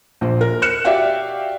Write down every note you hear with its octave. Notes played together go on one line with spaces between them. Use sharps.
A#1 C5
A#4
F6 F#6 C#7 E7
F#4 G4 D5 E5 F5 G5